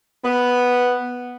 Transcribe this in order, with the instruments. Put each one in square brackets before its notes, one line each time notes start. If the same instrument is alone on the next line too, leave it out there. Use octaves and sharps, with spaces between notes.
[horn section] B3